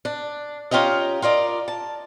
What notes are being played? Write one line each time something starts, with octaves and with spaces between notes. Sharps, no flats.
D4
C#4 F4 G4 A#4 D#5
F4 A#4 D5 D#5
A5